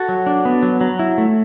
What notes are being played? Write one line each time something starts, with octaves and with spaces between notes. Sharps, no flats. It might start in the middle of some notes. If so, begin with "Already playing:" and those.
Already playing: F#4 A4
F#3
D4
B3
F#3
F#3
E4
A3